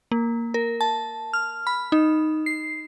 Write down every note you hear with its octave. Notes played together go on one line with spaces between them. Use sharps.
A#3
A#4
A5
F6
B5
D#4
C7